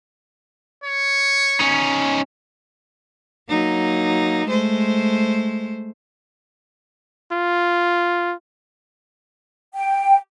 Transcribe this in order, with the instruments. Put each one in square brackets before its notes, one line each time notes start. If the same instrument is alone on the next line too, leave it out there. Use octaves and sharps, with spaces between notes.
[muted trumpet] C#5
[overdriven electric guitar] C#4 D#4
[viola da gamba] F#3 A#3 D#4
G#3 A3 C5
[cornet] F4
[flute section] G5